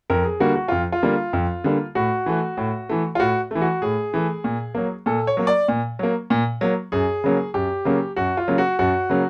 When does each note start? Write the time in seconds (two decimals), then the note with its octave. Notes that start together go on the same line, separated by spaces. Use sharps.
0.10 F2 A#4
0.25 G#4
0.40 D3 G3 A#3 F#4
0.56 F#4
0.68 F2 F4
0.92 F4
1.02 D3 G3 A#3
1.33 F2
1.64 D3 G3 A#3
1.95 A2 F#4
2.26 E3 A3
2.57 A2
2.89 E3 A3
3.15 F4
3.19 A2 F#4
3.51 E3 A3
3.61 F#4
3.82 A2 G#4
4.14 E3 A3
4.44 A#2
4.75 F#3 A#3
5.06 A#2 A4
5.27 C#5
5.37 F#3 A#3
5.47 D5
5.68 A#2
5.99 F#3 A#3
6.30 A#2
6.61 F#3 A#3
6.92 F#2 G#4
7.24 C#3 F#3 A#3
7.54 F#2 G4
7.85 C#3 F#3 A#3
8.16 F#2 F#4
8.37 F4
8.48 C#3 F#3 A#3
8.58 F#4
8.79 F#2 F#4
9.09 C#3 F#3 A#3